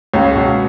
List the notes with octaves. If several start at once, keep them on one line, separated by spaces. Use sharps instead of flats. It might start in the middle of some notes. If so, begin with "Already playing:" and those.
C#2 C#4
B2